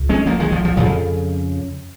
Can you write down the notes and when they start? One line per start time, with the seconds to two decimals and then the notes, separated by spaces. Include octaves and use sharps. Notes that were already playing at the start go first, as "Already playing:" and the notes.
Already playing: C#2
0.09 G#3 C#4
0.26 F3 A#3
0.40 D#3 G#3
0.52 F3
0.65 F3
0.77 F2 C#3 F3